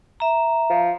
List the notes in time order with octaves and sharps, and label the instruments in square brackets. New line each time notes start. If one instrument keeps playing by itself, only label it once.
[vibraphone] E5 A#5
[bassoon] F3